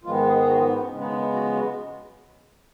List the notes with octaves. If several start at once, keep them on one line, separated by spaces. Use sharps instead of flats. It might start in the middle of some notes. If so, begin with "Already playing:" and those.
G#2 D#3 F3 G#3 B3 F4
G#3 G#4
G#4
F#3 F#4
F3 F4
D#3 D#4
C#4
C#3 G#3 B3 C#4
D#3 D#4
D#3 D#4
F#3 F#4
F3 F4
F#3 F#4